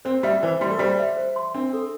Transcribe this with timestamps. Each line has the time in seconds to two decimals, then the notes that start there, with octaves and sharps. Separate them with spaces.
0.05 C4 C5
0.23 G3 E5
0.42 E3 C5
0.61 G3 C6
0.71 A3
0.79 G3 C5
0.99 E5
1.17 C5
1.36 C6
1.54 C4 D4
1.73 A4